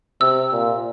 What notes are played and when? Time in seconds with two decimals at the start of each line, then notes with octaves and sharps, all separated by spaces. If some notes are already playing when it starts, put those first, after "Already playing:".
0.21 C3 E6
0.52 A#2